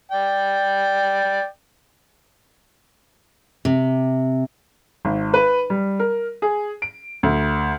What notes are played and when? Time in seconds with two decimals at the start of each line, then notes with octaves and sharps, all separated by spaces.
0.12 D5 G5
3.65 C3
5.05 G#1
5.34 B4
5.70 G3
6.00 A#4
6.42 G#4
6.82 D7
7.23 D2